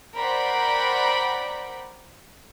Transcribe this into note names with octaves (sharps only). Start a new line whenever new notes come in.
A#4 C5 D5 F#5 G5 B5